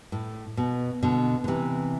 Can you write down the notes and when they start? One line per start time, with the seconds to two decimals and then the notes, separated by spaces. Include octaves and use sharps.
0.12 A2
0.57 B2
1.03 B2 D3
1.44 D3
1.48 C3 E3